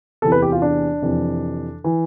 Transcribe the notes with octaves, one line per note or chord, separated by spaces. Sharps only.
E2 C3 E3 A4
B4
G4
F4
D4
F2 C3 E3
E3